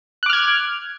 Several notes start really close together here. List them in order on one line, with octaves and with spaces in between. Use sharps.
F#6 D6 F6 G#6